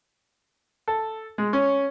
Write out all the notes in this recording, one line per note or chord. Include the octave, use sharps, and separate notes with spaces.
A4
G#3
C#4